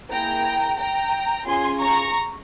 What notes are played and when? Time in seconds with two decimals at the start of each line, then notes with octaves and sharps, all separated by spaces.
0.11 A#3 E4 G#4 G5 A#5
0.78 G5 A#5
1.47 C#4 F4 G#4 G#5 C6
1.80 A#5 C#6